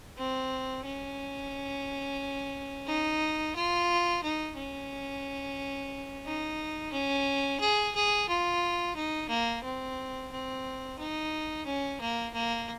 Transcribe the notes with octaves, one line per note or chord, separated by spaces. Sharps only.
C4
C#4
D#4
F4
D#4
C#4
D#4
C#4
G#4
G#4
F4
D#4
A#3
C4
C4
D#4
C#4
A#3
A#3